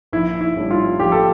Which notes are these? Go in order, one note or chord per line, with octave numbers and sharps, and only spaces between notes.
A#1 E4
E4
A2 G3 D4
F4
A#1 G4
A4